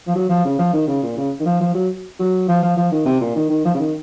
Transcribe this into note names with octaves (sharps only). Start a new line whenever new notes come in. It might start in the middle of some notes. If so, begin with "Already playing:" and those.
F3
F#3
F3
C#3
F3
D#3
C#3
A#2
C#3
D#3
F3
F3
F#3
F#3
F3
F3
F3
D#3
C3
A#2
D#3
D#3
F3
C#3
D#3